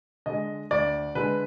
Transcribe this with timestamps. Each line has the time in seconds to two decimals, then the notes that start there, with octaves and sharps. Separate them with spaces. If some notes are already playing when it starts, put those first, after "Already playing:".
0.26 D3 G#3 D#5
0.71 D2 D5
1.15 D3 G#3 B4